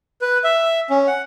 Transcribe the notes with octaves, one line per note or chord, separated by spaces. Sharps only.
B4
E5
C#4
F#5